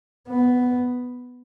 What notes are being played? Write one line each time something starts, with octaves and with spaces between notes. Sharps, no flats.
B3